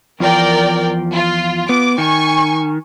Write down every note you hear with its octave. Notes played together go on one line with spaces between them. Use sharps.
E2 F3 A#4 D5 G5
F4
B3 D6
D#3 G#5 C#6